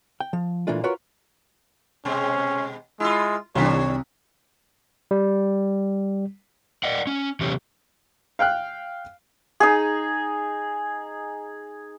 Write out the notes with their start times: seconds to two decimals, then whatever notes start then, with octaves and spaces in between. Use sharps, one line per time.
0.20 G5
0.33 F3
0.67 A#2 E3 A3 A#3 D4 F4
0.84 F4 F#4 A#4 B4 C#5
2.05 B2 G#3 C4 C#4
3.00 G#3 E4 F4
3.55 C2 C3 D#3 G3 D4 C#5 B6
5.11 G3
6.84 D5 D#5 F#5
7.07 C#4
7.41 C3 E3 F#3 C#4 G4
8.39 F5 G5 F6 F#6
9.60 D#4 G#4